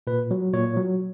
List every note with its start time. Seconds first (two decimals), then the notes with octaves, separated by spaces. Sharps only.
0.07 A#2 B4
0.31 F#3
0.53 A#2 C#5
0.76 F#3